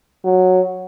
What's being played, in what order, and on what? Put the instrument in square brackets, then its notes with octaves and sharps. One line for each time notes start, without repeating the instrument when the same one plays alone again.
[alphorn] F#3